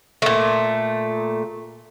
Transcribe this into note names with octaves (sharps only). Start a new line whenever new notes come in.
A#2 A3